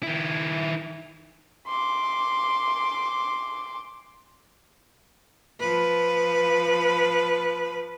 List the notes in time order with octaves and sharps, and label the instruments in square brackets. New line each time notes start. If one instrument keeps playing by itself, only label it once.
[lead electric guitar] D#3 E4
[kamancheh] C6 D6
[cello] F3 B4